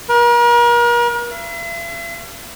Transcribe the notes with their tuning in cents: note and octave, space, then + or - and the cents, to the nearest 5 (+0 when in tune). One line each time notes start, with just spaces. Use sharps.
A#4 +40
E5 +45